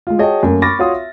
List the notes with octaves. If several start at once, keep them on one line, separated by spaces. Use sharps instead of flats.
G#3 F4
F#4 G#4 C#5 D#5 G5 A5
F#2 A3 A#3
B5 C#6 D6 F6 A6 A#6
F4 F#4 C#5 F5 C6 D#6
E5